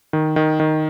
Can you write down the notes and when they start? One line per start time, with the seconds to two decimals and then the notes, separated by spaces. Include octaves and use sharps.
0.13 D#3
0.36 D#3
0.60 D#3